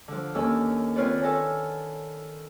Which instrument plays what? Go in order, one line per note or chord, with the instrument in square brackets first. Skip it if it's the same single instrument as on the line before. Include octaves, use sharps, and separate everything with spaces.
[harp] D3 F3
D#2 C#4 D4 A4 G#5 E6
D#3 C4 F4 B4 C#5 D5
A4 C#5 D#5 F#5 G#5